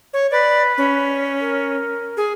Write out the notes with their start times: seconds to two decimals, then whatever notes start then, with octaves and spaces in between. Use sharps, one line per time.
0.13 C#5
0.31 B4 D5
0.78 C#4
1.40 A#4
2.17 G#4